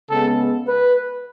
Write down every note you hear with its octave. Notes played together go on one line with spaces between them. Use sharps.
C#3 G#3 B3 A4
B4